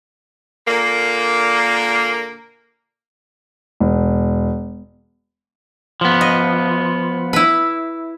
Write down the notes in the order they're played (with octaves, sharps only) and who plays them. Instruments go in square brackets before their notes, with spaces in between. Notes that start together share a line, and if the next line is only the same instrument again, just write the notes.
[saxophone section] A#2 D3 A#3
[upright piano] E1
[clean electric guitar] F3 B3
[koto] D#5
E4 B4